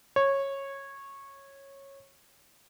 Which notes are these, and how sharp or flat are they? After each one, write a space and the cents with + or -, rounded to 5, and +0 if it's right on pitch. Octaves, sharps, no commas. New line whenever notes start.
C#5 -15